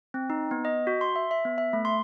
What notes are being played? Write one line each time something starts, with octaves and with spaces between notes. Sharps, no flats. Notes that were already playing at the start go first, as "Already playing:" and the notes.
C4
D#4
B3
D#5
F#4
C6
E5
E5
B3
E5
A3
C6